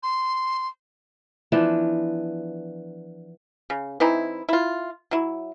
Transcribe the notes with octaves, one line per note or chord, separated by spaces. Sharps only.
C6
E3 F3 B3 D4
C#3
E3 C4 D#4 E4
E4 F4
F#3 E4